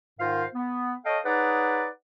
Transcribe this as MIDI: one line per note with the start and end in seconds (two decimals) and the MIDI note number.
0.20 0.44 44
0.20 0.44 51
0.20 0.44 65
0.20 0.44 70
0.20 0.44 72
0.20 0.44 77
0.54 0.95 59
1.05 1.18 69
1.05 1.18 73
1.05 1.18 75
1.05 1.18 77
1.05 1.18 79
1.24 1.86 63
1.24 1.86 68
1.24 1.86 71
1.24 1.86 73
1.24 1.86 74
1.24 1.86 78